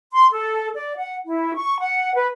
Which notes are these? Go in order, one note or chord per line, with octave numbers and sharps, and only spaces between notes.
C6
A4
D5
F#5
E4
C#6
F#5
B4